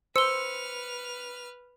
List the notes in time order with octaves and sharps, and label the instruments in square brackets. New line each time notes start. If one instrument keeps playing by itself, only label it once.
[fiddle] B4 F6 [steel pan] C5 [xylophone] E6 G7 [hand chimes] C#7